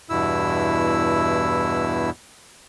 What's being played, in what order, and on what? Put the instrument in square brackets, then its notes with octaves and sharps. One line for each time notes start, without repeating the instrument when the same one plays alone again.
[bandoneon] E2 G2 B2 E4 E6